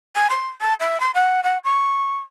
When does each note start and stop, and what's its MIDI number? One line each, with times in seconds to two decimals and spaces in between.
0.16 0.28 80
0.30 0.48 84
0.61 0.74 81
0.80 1.00 76
1.00 1.11 84
1.14 1.40 78
1.44 1.58 78
1.64 2.19 85